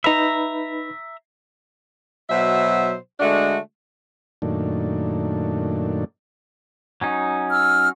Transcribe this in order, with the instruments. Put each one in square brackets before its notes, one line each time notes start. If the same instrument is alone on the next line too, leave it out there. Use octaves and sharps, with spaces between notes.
[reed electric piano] D#4 B4 B5 [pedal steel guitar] E5 A#5
[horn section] B2 F#3 C5 E5
D3 G#3 A3 D4 F#4
[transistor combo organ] F#2 A#2 D#3 A3 D4
[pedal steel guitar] F#3 C#4 D#4
[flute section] E6 F6